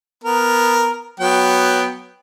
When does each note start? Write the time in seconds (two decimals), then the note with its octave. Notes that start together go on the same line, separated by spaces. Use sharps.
0.24 B3 A#4
1.20 F#3 B3 G5